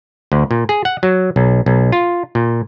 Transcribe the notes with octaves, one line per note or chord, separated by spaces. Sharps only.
D2
A#2
G#4
F#5
F#3
B1
B1
F4
A#2